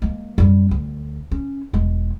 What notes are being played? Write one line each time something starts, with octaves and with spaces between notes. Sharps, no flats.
G#3 A#3
F#2 G3
D2
C#4
E1 G#3